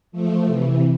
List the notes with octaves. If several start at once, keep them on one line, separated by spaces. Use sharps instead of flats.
F3 A3
C3 E3